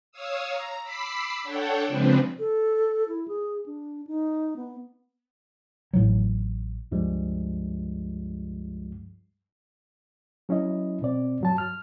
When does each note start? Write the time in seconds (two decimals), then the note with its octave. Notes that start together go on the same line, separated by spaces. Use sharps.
0.12 C#5 F5 D#6 E6
0.50 A#5
0.83 B5 D6 E6 B6 C7
1.43 D4 A4 C#5 F#5 G5
1.87 C#3 F3 G#3 C4 D4 B4
2.39 A4
3.08 E4
3.28 G#4
3.66 D4
4.07 D#4
4.57 B3
5.93 A1 A2 E3 F#3
6.91 C#2 G2 F3 G3 G#3
10.49 F#3 C#4 E4 D#5
11.02 B2 C4 D5
11.41 G2 F#3 A5
11.58 F6